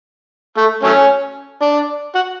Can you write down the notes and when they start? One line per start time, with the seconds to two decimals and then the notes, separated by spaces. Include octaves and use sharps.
0.57 A3
0.83 F#3 A3 C#4
1.62 D4
2.15 F#4